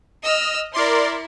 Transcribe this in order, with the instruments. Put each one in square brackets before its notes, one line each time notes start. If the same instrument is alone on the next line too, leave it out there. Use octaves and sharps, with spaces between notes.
[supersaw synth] D#5 [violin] E6 F6
[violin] E4 [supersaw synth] A#4 D5 C6